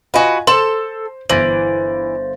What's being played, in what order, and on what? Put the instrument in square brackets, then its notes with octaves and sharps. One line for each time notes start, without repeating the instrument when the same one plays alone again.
[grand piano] F4 D#5 G#5 [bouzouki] F#4 B4
[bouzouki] A4 A5 [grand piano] C5 [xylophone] C6
[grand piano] G1 A#6 F#7 [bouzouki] E3 [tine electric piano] C5 A6